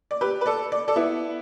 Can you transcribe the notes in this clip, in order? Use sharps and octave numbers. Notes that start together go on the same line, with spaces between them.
D5
G4 B4
B4
A4 D5
D5
A4 D5
B3 E4